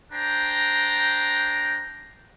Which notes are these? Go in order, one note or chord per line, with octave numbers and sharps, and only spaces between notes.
D4 C5 G5 A#5